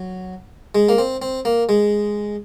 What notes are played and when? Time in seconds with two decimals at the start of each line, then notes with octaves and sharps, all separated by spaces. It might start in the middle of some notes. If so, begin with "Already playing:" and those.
Already playing: F#3
0.75 G#3
0.89 A#3
0.98 C4
1.22 C4
1.45 A#3
1.69 G#3